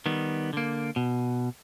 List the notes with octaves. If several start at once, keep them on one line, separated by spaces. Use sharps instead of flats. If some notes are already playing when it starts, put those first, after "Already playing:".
D#3 G3 B3
D3 A#3
B2